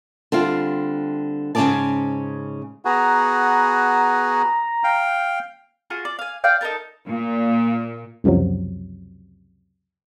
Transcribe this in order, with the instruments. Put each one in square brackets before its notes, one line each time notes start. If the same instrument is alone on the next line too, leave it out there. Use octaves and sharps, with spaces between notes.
[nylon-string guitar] D3 G3 C4 F4
G#2 C#3 G#3 C#4 D5 A5
[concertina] B3 F#4 G#4 [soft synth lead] A#5
[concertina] F5 G5
[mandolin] F4 F#4 G#4
D5
F5 G#5
D5 F5 G5
D#4 A4 A#4 A5
[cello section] A#2
[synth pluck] C#2 F#2 C3 F3 F#3